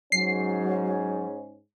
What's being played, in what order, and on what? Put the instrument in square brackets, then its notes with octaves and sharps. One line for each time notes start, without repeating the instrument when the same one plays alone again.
[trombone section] G#2 C#4 [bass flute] F#3 [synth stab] C7